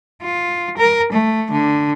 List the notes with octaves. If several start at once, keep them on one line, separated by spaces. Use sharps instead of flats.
F4
A#4
A3
D3